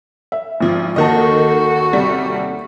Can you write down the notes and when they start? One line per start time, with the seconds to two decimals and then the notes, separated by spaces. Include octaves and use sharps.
0.32 E5
0.60 G#1 F3
0.96 D#2 D#3 F#4 A4 D#5 A5
1.93 C3 G3